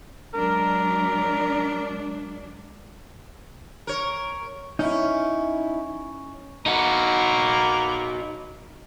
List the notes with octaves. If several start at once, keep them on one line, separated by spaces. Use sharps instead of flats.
F#3 G#3 D4 A#4
A#4 C#5
C#4 D#4 E4
A#3 B3 D#4 F#4